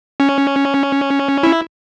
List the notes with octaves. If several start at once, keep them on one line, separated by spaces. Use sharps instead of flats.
C#4
E4